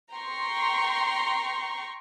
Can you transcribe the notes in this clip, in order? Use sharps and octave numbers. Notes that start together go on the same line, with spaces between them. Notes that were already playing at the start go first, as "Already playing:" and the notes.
G5 A#5 C6 C#6